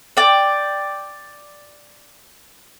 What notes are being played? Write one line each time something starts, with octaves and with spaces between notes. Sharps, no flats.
D5 G5